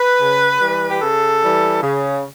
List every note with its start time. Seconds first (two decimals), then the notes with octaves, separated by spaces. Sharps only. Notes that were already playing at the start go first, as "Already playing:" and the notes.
Already playing: B4
0.20 C#3
0.61 E3 G3
0.90 G4
1.01 C#3 A4
1.41 E3 G3
1.82 C#3